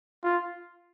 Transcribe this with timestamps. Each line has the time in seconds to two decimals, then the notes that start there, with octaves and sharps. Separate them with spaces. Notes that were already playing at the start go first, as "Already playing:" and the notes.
0.23 F4